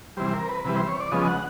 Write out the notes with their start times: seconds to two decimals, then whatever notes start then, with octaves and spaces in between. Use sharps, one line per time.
0.17 C3 E3 G3 C5
0.33 A#4
0.48 B4
0.64 C3 E3 G3 B4
0.76 C5
0.88 C#5
1.00 D5
1.12 C#3 F3 G#3 B3 D#5
1.27 F#5